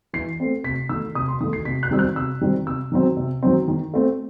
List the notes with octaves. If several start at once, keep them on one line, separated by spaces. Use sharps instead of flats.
E3 C7
A3 C4
C3 B6
D#3 A3 E6
C3 D#6
C6
D#3 A3 D#6
C7
C3 B6
F#6
D#3 G3 C4 E6
F#6
C3 E6
D#3 G3 C4
C3 E6
D#3 F#3 C4
C3
D#3 F#3 C4
D#3
A3 C4